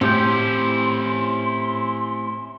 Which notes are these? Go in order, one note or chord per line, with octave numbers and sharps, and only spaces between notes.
A2 C4 C#4 E4 G4 G5 C6